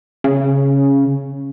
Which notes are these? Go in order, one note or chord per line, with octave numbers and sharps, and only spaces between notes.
C#3